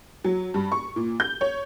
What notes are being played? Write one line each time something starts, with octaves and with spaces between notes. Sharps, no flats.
F#3
G2
C#6
A#2
G6
C#5